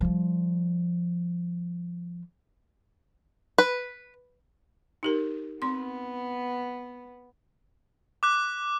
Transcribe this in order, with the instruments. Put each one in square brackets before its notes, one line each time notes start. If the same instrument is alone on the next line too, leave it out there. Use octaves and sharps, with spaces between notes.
[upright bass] F3 G3
[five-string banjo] B4
[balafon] D#4 G4 A#4
[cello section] B3 [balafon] C4 C6
[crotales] D6 F#6